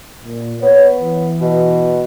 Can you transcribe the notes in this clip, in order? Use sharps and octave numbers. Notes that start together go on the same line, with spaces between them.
A#2
B3 C#5
E3
B2